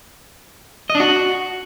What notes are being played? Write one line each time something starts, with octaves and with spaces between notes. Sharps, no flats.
D#5
D4
F#4